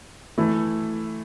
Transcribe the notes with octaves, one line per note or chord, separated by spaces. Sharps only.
E3 A3 E4